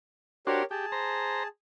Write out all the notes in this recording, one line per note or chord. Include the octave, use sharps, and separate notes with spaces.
D4 F#4 G4 A#4 C5 C#5
G4 G#4 A5
C5 A#5